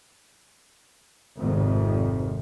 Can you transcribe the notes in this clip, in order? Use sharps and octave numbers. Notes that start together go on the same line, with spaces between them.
G#1 F2 G#2 C3 D#3